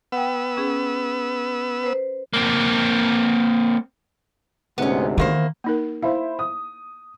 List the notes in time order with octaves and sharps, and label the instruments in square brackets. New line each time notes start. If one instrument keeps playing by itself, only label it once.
[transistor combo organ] B3 E6 [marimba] F#5 G5
[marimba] C#4 G#4
B4 C5
[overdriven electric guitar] A#3 C4
[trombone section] D2 G#2 C3 [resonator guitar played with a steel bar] B3 C#4
[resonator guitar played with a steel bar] E2 A#3 C5 [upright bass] D#3
[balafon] A#3 D#4 A#4
[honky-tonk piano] E4 C5 E5 [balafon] F5
[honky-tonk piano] D#6